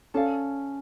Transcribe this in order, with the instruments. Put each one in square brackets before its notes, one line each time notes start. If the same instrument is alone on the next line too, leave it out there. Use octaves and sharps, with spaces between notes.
[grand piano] C#4 [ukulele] A4 D5 F5